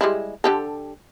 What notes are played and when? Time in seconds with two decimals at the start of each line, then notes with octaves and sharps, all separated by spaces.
0.01 G3 G#3 E4
0.44 D3 G4 A4